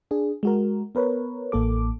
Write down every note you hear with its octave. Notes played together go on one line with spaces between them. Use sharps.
D4 G#4
G#3 F#4 A#4
B3 A#4 B4 C#5
A1 A#3 A4 D6